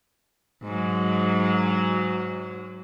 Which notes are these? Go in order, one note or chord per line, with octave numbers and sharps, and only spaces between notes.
G#2 F#3